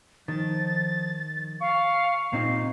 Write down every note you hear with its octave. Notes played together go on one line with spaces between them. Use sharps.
D#3 F3 A6
F5 C#6
A#2 C4 D#4 C7